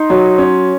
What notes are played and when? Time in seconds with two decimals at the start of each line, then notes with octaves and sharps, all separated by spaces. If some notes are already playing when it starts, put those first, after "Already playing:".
Already playing: D#4 C6
0.10 F#3
0.38 C#4